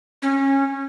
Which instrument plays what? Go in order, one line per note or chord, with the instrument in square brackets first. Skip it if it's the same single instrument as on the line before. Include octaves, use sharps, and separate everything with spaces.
[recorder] C#4